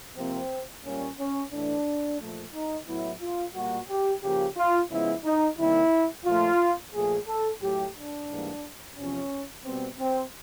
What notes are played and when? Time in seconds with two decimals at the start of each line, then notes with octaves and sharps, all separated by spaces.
0.17 C3 F3 A#3 C4
0.85 A#2 G3 A#3 C#4
1.19 C#4
1.52 A2 E3 A3 D4
2.20 A#2 F3 A3
2.54 D#4
2.88 A2 F#3 B3 E4
3.21 F4
3.55 A#2 G3 A#3 F#4
3.89 G4
4.23 C#3 F3 A#3 G4
4.57 F4
4.90 C#3 F3 G#3 B3 E4
5.25 D#4
5.58 C3 D#3 G3 A#3 E4
6.26 A#2 F3 A3 F4
6.94 A#2 F3 A3 G#4
7.27 A4
7.61 A2 F#3 A3 G4
7.95 D4
8.29 G#2 E3 G3 A#3
8.96 E2 C3 F3 C#4
9.65 B2 G3 B3 C4
9.99 C4